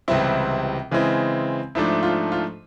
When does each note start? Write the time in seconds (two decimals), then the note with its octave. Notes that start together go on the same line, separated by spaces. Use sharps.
0.08 C#2 C3 E3 G3 C4 E4
0.91 C#3 E3 G#3 C4 E4
1.75 G#2 F3 A3 D4 E4
2.03 F4
2.32 F4